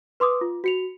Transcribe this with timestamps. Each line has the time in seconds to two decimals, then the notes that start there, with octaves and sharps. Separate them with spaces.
0.20 B4 C6 D6 D#6
0.41 F4
0.64 F#4 C#7 F7